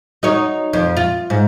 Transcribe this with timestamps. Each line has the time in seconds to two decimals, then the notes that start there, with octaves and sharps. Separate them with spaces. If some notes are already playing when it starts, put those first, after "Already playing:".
0.23 D#4 F#4 C#5
0.73 F2
0.97 F4
1.30 G#2